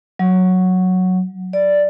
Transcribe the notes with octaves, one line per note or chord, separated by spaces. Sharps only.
F#3
D5